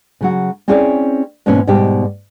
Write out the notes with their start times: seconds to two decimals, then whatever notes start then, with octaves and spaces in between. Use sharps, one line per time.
0.21 C#3 F#3 F#4
0.68 C4 C#4 E4 G#4 C#5 D5
1.46 G#2 B2 E3 A#3 C#4
1.67 G#2 B2 G3 D#4 G4